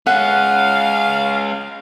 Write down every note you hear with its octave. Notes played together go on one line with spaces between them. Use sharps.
G#3 C#4 F5 F#5